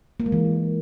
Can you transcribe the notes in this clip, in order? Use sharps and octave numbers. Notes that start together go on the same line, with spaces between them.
A#3
G#3
E3